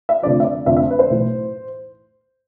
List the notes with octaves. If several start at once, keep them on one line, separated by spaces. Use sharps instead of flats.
E5
F1 F2 D3 F3 D5
E5
D5
F1 F2 D3 F3 E5
E5
B4
C5
B1 A2 E3